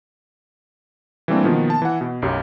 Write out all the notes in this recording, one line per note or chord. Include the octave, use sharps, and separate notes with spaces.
E3 G3 A3 A#3 C4 D4
B2 D#3 F3 A#3 B3
A5
E3 F#5
B2
B1 F#2 G4